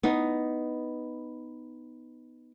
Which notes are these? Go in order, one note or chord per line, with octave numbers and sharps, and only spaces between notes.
B3 D#4